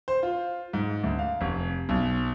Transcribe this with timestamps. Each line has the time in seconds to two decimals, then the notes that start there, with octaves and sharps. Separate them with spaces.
0.08 C5
0.23 F4
0.73 G#2
1.04 D2
1.19 F5
1.41 F1
1.89 B1